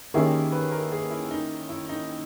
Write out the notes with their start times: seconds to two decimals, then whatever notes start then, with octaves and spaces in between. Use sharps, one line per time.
0.14 D#3 A#3 C#4 E4 G4 G#4
0.52 B4
0.71 A#4
0.92 G#4
1.10 E4
1.31 D#4
1.69 E4
1.89 D#4